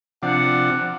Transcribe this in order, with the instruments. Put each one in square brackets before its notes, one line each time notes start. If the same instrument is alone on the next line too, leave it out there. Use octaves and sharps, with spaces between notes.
[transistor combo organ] C3 F3 D4 [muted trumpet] F#5